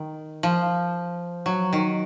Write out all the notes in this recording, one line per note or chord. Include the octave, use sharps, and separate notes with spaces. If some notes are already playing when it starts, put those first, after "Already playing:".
Already playing: D#3
F3
F#3
D#3